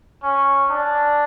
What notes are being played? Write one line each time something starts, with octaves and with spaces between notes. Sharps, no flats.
C#4
D4